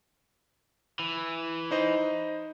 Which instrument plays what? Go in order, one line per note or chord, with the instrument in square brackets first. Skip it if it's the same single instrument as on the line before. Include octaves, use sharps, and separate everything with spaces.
[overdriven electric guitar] E3
[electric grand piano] D#4 C5 D#5